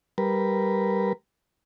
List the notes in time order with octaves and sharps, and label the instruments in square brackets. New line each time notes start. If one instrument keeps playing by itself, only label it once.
[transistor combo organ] G3 A#4 B4